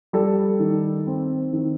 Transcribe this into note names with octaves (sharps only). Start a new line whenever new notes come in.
G3 A4
D#3
C4
D#3